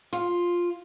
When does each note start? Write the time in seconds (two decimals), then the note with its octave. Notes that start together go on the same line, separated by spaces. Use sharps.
0.13 F4